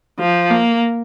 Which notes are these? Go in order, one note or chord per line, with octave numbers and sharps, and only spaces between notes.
F3
A#3